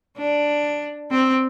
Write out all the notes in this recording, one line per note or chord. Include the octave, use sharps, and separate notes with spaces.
D4
C4